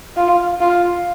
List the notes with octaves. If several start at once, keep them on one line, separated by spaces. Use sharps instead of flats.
F4
F4